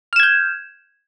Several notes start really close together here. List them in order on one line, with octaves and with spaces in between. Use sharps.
F6 E7 G#6 G6